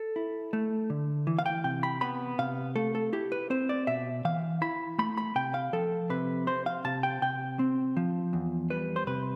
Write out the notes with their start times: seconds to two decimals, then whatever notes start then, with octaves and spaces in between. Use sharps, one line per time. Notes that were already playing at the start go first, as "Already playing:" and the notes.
Already playing: A4
0.16 E4
0.53 A3
0.90 D3
1.27 E3
1.39 F5
1.46 G5
1.64 C3 G5
1.83 B5
2.01 B3 B5
2.39 C3 F5
2.76 A3 A4
2.95 A4
3.13 E4 G4
3.32 B4
3.50 C4 C5
3.69 D5
3.87 B2 E5
4.25 E3 F5
4.62 E4 B5
4.98 A3 B5
5.17 B5
5.35 C3 G5
5.54 F5
5.73 F3 A4
6.10 C3 B4
6.47 C4 C5
6.66 F5
6.84 C3 A5
7.03 G5
7.22 C3 G5
7.59 C4
7.97 F3
8.33 E2
8.70 G3 B4
8.96 C5
9.07 C3 B4